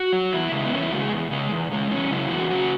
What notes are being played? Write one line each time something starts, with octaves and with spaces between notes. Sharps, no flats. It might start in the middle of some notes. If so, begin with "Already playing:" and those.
Already playing: F#4
F#3
E2 E4
C#3 G#3
B3
E2 C#4
E4
C#3 G#3 F#4
G#4
E2
C#3 G#3
E2
C#3 G#3
E2 C#4
C#3 F#3 E4
E2 F#4
C#3 F#3 F#4